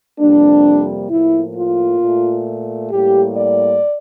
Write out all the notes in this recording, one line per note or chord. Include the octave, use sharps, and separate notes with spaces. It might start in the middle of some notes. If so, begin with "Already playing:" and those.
F2 C3 G3 A#3 D4
A2 F3 A#3 E4
F4
A#2 A3
A2 G3 A#3 G4
D5